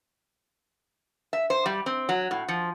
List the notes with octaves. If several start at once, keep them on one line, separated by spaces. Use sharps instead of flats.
E5
C5
G3
C4
F#3
A2
F3